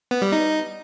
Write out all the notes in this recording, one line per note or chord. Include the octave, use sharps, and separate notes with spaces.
B3
G3
D#4